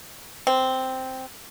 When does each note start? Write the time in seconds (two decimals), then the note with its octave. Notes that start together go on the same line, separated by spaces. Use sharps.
0.47 C4